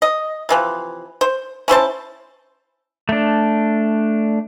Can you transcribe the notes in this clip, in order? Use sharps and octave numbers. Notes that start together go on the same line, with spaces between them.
D#5
C3 E3 F3
C5
C#4 E4 C5 A5
A3 D4